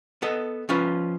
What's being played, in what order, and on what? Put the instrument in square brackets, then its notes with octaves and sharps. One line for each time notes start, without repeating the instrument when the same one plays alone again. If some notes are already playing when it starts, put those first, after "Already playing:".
[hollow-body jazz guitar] B3 A4 D#5
F3 C#4 F4 B4